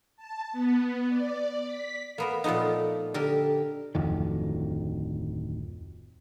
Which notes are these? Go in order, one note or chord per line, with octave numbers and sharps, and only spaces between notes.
A5
B3
D5
B6
A#3 B3 A#4
A#2 F3 A3 B3 D#4
D3 G4 A#4
D1 F2 D#3